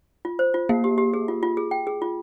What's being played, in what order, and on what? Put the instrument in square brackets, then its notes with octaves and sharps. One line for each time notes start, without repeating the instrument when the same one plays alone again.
[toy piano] F4
C5
F4
[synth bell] A#3 [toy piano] F5
[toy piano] G4
G4
G#4
F4
F4
G#4
G5
G#4
F4